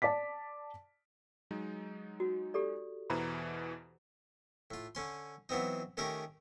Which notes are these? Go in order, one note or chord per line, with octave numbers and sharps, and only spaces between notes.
D5 A5 D6 B6
F#3 G#3 D#4
F#4
G4 A4 D5
E2 B2 E3 C5 A#5 B5
A2 F4
D3 C#4 C6
E3 F#3 B3 C4 D#4
D#3 A3 C#4 G4 A#4